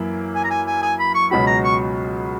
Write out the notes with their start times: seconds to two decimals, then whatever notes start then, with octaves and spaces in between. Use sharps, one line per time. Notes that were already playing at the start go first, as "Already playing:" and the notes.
Already playing: F#2 E3 A#3 E4
0.35 G#5
0.44 A#5
0.51 G#5
0.67 G#5
0.82 G#5
0.99 B5
1.15 C#6
1.31 C#2 B2 F#3 C#4 F#4 B5
1.47 A#5
1.64 C#6